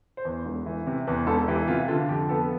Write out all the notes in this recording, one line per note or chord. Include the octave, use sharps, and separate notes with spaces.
C5
E2 B4
E1
E3
C3
E2 B4
E1 A4
E3 G4
C3 F4
D3 F4
F2 G4
B3 A4